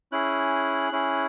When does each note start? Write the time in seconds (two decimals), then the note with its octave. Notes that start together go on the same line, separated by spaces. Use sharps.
0.12 C#4 E4 G#4 F#6
0.92 C#4 E4 G#4